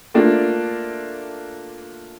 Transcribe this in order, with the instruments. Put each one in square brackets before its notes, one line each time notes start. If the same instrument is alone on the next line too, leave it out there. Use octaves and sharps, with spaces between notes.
[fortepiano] A3 A#3 D4 F4